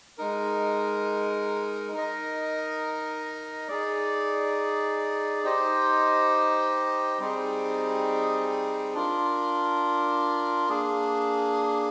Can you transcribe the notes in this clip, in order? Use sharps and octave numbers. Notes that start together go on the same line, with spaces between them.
G#3 D#4 A#4
D#4 A#4 D#5
D#4 G#4 D5
D#4 G4 C5 D#5
G3 C4 D#4 G#4
D4 F4 A#4
A#3 D4 G#4